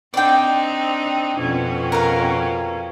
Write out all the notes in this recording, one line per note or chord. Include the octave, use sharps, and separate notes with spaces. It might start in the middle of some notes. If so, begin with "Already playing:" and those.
C4 D4 D#4 D5 G5
F2 B2 C#4
A#4 F5